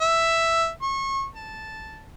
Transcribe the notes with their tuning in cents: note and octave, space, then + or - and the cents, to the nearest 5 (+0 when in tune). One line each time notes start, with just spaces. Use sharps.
E5 +5
C#6 -30
A5 -5